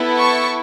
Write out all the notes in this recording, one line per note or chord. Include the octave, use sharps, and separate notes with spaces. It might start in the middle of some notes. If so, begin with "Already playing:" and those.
Already playing: B3 E4 A4
A5 C#6